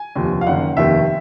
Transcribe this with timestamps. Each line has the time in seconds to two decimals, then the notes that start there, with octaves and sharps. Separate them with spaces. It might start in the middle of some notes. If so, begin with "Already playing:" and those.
Already playing: G#5
0.15 F1 D#2 D3 F3
0.41 F5
0.46 F#1 F#2 D#3 F#5
0.77 F1 D#2 D#3 E5